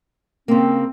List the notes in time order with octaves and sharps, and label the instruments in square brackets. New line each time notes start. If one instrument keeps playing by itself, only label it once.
[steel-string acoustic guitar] C#3 A#3 [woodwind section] C4